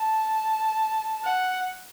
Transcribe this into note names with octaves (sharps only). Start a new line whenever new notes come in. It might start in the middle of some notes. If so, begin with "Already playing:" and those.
Already playing: A5
F#5